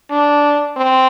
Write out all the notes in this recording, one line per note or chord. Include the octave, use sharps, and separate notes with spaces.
D4
C4